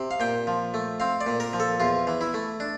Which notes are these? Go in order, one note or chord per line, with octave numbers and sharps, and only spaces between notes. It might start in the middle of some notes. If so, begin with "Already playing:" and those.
Already playing: C3
F5
A#2 G5
F3
A3
C4 F5
D5
A#2
A#4
F3
A4
E2 F4
E3
E4
A3
D4